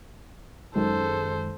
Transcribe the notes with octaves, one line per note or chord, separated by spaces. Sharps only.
F#2 D#3 G#3 A4 C5